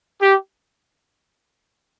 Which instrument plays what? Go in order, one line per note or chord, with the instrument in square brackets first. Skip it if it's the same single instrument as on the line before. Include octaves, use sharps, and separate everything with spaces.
[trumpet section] G4